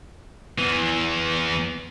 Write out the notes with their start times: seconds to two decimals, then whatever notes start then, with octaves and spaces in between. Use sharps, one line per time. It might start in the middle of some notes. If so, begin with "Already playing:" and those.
0.58 E2 E3